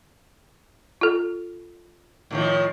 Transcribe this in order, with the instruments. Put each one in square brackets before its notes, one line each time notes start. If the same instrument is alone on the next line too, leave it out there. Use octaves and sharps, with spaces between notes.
[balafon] F4 A4
[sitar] A2 D#3 F3